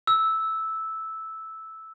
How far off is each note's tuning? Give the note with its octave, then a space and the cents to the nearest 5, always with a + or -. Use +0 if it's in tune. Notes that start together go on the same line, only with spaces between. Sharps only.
E6 -10